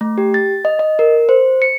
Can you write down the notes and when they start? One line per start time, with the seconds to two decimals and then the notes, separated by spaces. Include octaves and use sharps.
0.01 A3
0.18 G4
0.34 A6
0.65 D#5
0.79 D#5
0.99 A#4
1.29 C5
1.62 C#7